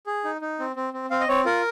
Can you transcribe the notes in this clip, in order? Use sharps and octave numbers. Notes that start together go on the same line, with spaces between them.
G#4
D#4
D#4
C4
C4
C4
C4 F5
D#5
C4 C#5
F4 A#4